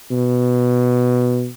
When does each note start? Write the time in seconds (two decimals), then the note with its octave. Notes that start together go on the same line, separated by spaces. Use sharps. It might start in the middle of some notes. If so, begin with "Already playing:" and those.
0.11 B2